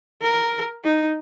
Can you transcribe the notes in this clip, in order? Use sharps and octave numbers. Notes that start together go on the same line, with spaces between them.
A#4
D#4